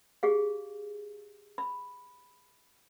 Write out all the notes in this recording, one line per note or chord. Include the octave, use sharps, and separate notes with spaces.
G4 G#4 F5
B5